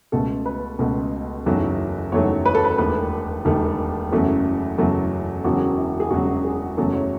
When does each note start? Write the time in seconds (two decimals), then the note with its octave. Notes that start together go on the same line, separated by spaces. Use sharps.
0.12 C#2 B2 A3 A4
0.46 B4
0.79 C#2 B2 A3
1.46 F#1 E2 D#3 F#3 A3
2.12 F#1 E2 D#3 F#3 A3 C#5
2.46 B4
2.55 A4
2.64 B4
2.78 E1 D#2 D#3 A3 B4
3.45 E1 D#2 D#3 A3
4.12 F#1 E2 C#3 F#3 A3
4.78 F#1 E2 C#3 F#3 A3
5.44 E1 E2 C#3 F#3 F#4
5.77 E4
6.00 G#4
6.11 E1 E2 C#3 F#3 F#4
6.45 G#4
6.77 F#1 E2 C#3 F#3 A3 A4
6.94 C#5